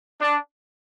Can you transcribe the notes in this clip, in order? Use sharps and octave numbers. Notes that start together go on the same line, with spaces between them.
D4